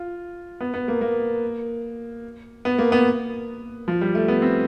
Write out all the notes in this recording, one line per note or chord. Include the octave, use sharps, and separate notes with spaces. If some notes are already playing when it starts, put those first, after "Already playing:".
Already playing: F4
B3
B3
A#3
A#3
B3
A#3
B3
F3
G3
A3
B3
C4